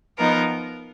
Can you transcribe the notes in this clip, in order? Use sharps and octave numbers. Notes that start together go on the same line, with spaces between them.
F3 B3 D#4 A#4